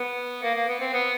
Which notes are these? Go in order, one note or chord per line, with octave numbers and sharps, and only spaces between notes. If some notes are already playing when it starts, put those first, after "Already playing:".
Already playing: B3
A#3
A#3
B3
C4
B3